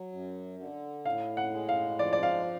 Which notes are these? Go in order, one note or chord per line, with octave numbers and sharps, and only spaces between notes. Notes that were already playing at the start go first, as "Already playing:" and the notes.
Already playing: F#3
F#2
D3
A2 F5
F#5
G#3
F5
F3 D5
D5
F5